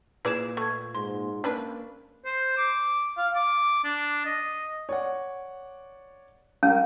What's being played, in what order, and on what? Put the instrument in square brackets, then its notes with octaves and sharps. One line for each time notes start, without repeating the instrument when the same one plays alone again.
[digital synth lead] A#2 [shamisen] E4 G#4 D5 [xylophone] B4 E7
[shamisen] A3 [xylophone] C#6 G#6
[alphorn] G#2 [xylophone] C6
[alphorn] A#3 [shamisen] C#4 D4 B4
[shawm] C5
D6
F5
D6
D4
D#5
[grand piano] C#5 D5 F#5
[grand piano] G3 G4 A#4 [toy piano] C#4 [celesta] F5